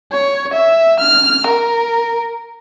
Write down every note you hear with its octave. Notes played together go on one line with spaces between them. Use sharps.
C#5
E5
F6
A#4